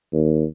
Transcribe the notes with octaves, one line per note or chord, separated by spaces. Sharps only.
D#2